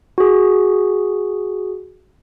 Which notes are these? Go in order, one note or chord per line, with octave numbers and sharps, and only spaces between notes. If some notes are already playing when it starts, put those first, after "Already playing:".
F#4 G#4